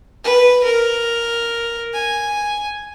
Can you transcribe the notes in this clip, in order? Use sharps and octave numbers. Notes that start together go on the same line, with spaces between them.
B4
A#4
G#5